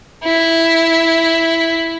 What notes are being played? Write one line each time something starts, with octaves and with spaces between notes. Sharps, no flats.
E4